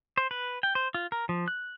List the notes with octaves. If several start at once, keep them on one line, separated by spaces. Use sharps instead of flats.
C5
B4
G5
C5
F4
A#4
F3
F#6